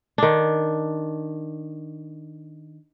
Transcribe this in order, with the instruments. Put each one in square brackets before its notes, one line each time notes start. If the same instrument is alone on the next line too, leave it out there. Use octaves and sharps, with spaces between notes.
[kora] D#3 D4